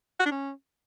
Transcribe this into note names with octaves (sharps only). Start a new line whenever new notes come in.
F#4
D4
C#4